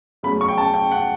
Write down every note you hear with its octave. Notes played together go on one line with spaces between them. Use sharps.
E2 C#3 F#3 A3 B5
C#6
G5
A5
G5
F#5